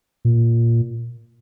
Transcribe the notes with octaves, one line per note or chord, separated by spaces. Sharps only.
A#2